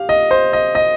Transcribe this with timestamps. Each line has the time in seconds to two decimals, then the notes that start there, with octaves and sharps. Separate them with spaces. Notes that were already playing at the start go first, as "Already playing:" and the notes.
Already playing: G4 F5
0.09 D#5
0.31 C5
0.53 D#5
0.75 D#5